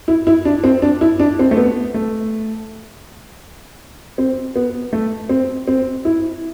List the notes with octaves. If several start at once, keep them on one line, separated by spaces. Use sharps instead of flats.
E4
E4
D4
C4
D4
E4
D4
C4
A3
B3
A3
C4
B3
A3
C4
C4
E4